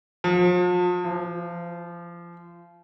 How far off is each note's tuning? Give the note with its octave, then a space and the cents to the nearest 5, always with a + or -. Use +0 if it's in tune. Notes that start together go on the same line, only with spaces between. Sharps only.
F3 +40
F3 -25